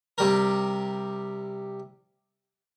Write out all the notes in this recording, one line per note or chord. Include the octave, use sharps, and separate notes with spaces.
C3 G3 A#4